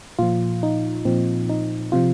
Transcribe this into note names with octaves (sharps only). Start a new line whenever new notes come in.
A#2 F3 F4
D#4
A#2 F3 C4
D#4
C3 F3 F4